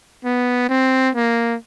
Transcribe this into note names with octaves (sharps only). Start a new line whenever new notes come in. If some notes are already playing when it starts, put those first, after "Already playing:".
B3
C4
A#3